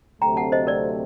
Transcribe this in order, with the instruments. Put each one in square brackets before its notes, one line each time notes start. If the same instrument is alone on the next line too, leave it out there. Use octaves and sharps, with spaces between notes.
[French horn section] D2 C3 F#3 A3 C4 [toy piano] G5 A#5
[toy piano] F#5 A5
C5 D#5
A#4 D5